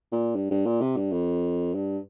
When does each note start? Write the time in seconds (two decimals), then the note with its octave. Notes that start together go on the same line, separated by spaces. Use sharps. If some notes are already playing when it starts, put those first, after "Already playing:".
0.12 A#2
0.35 G2
0.51 G2
0.66 A#2
0.81 C3
0.97 G2
1.12 F2
1.74 G2